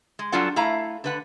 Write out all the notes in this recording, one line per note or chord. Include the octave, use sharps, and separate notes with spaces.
G#3
F#3 G3 D4 F4 A4 F#5
A3 E4 F5 A#5
D3 B4 F#5